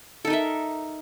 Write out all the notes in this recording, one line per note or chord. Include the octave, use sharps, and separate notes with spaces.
D#4 A4 A#4 E5